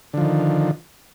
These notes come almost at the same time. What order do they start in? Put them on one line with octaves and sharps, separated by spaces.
D3 F3 D#3